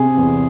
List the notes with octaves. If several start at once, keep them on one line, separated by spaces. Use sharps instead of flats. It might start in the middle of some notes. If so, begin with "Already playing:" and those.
Already playing: C3 G#4
E2